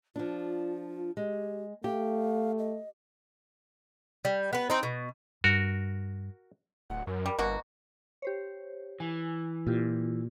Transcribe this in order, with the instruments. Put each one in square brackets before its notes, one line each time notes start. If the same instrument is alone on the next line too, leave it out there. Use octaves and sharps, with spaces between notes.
[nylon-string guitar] F3 D4 [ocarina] F4
[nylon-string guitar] G#3 [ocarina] G4
[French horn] A3 [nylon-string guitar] G4 [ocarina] F5
[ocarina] D#5
[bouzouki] G3
B3 B4
C4 D#4
B2
[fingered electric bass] G2 [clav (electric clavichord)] F#4 A#4
[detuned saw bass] D1 [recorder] F#5
[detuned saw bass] F#2 [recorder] A#4
[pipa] G3
[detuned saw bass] G1 [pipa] B2 A#3 F#4
[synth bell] G4 C5 C#5
[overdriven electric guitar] E3 [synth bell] G#5
[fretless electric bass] A#2 [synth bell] E4 F4 G4